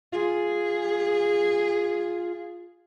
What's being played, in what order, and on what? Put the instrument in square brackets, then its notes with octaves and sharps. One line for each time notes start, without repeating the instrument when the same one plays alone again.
[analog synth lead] F4 [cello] G#4